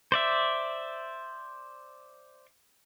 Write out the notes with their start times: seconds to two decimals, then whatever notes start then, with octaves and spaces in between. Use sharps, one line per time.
0.12 C5 D5 E5